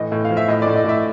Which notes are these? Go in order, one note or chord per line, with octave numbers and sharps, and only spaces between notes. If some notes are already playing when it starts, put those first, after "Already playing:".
Already playing: A2 E3 D#5
A2
F5
F3
E5
A2 D#5
A2 D5
D#5
A2 E5